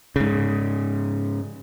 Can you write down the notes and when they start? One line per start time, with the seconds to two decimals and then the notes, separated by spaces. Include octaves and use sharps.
0.16 G#2 C#3